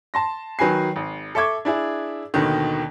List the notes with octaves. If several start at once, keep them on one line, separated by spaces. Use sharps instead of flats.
A5 C6 A#6
D#3 F#3 B4 G#5 C7
G#1
A4 E5 C#6 D6 G#6
D4 E4 G#4
D#2 B2 D3 D#3